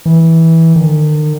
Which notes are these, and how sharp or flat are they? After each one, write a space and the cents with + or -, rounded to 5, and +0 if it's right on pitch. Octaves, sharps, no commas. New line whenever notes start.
E3 -15
D#3 -45